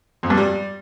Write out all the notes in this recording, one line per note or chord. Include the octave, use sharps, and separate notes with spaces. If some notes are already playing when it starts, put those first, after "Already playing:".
F2
G2
G3